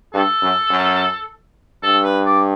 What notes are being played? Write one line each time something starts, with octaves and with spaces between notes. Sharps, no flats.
G2 A4
F#2
F#2
G2 A4
B4
D5